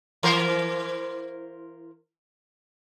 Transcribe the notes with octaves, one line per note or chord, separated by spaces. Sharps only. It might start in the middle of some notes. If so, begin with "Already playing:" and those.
E3 A#4 C5